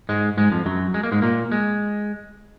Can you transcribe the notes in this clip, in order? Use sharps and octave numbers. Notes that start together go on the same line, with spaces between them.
G#2 G#3
G#2 G#3
F2 F3
F#2 F#3
G#3
A#3
G#2 G#3
A#2 A#3
G#3